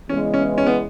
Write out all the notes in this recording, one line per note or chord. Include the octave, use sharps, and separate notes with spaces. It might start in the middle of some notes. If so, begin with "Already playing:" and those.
E2 C#3 E3 G#3 C#4
C#4
C#4
B3